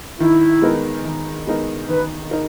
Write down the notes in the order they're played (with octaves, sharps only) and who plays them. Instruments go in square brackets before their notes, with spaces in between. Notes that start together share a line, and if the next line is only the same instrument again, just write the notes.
[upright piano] D#3 [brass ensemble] E4
[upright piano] G#3 B3 D#4 A#4
D#3
G#3 B3 D#4 A#4
[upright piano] D#3 [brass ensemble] B4
[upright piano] D#4 A#4